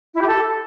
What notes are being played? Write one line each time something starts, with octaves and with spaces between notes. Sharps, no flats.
E4
G4
A4